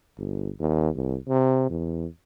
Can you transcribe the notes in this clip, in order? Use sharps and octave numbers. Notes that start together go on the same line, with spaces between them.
G1
D#2
C2
C3
E2